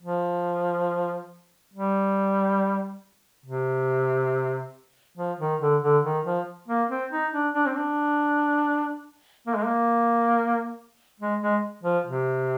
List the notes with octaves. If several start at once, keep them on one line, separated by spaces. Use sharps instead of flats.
F3
G3
C3
F3
D#3
D3
D3
D#3
F3
A#3
C4
D#4
D4
D4
C4
D4
A#3
G#3
A#3
G#3
G#3
F3
C3